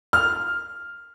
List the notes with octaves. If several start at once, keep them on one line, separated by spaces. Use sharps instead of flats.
F6